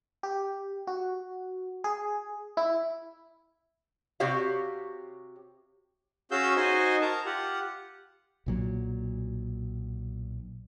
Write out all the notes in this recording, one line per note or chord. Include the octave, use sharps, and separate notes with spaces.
G4
F#4
G#4
E4
C3 F#4 G4 C#5 F5
C#4 F#4 G#4 F5 E6 G6
D#4 F#4 C5 D#5 G#5
A#4 A5 A#5
F4 G4 F#5
B1 A#2 F#3